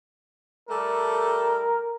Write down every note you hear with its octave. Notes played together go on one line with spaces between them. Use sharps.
G3 A3 A4 A#4